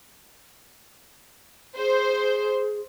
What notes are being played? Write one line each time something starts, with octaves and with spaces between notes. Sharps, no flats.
G#4 C5